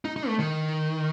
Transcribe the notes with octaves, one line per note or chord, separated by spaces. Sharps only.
D#4
D#4
A3
D#3